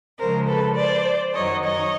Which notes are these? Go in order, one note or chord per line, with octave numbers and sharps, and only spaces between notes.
C#3 F3 G#3 A#4 C5
A4 B4
C5 D5
F#2 D#3 F#3 C#5 D#5
C#5 D#5